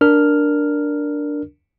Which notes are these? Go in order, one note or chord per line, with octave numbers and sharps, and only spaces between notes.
D4 A#4 F6